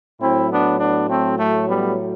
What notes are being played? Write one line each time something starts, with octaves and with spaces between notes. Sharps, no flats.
A2 F#3 C4 E4
B3 D4
B3 D4
A3 C4
A3
G3 B3